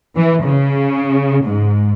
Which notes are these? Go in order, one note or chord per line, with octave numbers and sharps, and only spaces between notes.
E3
C#3
G#2